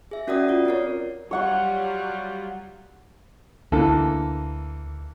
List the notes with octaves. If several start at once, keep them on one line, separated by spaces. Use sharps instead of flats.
G#4 E5
C#4 F#4 A#4 D5 F#5 D#6
F4 D5
C4 F4 A#4 C#5
F#3 G3 F4 C#5 F#5 C#6
D2 E3 A#3 D4 A4